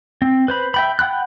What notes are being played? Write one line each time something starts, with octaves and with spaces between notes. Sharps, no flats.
C4
B4 C5 B5
E5 G5 B5
F#5 G5 B5 F#6